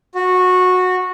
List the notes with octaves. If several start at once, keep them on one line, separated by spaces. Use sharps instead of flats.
F#4